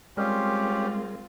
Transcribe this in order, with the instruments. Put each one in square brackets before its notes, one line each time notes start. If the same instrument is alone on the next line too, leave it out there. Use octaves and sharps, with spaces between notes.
[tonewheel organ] G3 G#4 A#4 [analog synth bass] G#3 [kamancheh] C4 F4 [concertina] C#4 G4